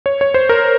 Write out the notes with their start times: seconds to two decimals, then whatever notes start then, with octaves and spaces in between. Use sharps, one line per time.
0.06 C#5
0.21 C#5
0.34 C5
0.49 A#4